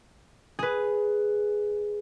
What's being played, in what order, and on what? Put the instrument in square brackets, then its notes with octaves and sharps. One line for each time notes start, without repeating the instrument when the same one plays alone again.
[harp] G#4 B4